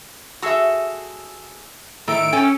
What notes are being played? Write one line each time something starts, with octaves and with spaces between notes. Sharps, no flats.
F#4 G#4 A4 E5 C#6
A2 D#3 A4 A#4 E5 D7
C#4 A4 G5 G#5